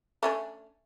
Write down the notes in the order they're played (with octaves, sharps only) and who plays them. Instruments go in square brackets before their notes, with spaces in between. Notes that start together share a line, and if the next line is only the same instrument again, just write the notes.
[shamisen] A3 C#4 D4